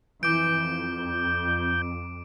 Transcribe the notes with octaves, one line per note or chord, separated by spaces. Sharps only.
F2 E3 D6 G6 D7
F2